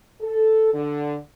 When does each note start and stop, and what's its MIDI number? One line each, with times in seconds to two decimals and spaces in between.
0.20 0.73 69
0.74 1.16 50